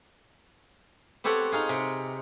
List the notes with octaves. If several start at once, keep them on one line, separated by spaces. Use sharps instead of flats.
B3 C4 G4 A4 C#5 F#5
D#4 F4 G#4
C3